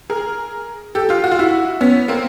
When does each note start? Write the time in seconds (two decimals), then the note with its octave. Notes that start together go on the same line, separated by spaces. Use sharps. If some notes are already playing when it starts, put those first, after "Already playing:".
0.10 G#4 A#4
0.95 G4 A4
1.09 F4 G4
1.24 F#4
1.31 F4
1.39 E4 F#4
1.81 B3 C#4
2.08 A#3 C4